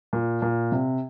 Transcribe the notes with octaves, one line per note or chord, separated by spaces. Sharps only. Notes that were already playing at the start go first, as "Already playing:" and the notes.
A#2
A#2
C3